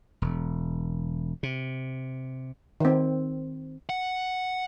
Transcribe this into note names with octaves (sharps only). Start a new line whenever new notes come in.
E1
C3
D#3 C4
F#5